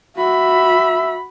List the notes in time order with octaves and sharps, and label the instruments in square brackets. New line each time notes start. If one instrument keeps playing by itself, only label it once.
[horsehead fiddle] F#4 B5 [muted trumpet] E5